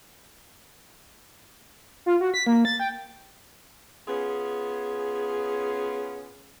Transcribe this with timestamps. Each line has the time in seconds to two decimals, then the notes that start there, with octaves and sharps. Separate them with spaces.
2.06 F4
2.21 F#4
2.34 B6
2.47 A#3
2.65 A6
2.80 G5
4.07 B3 C#4 F4 G#4